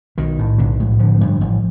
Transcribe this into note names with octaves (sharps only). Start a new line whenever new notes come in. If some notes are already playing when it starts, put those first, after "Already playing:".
B1 D#3
A2
B1 D3
A2
D3 F3
G2
A1